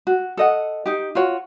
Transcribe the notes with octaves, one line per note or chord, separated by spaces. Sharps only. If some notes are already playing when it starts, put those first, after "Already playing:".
F#4
A4 D#5 F#5
D#4 G4
F4 F#4 C#5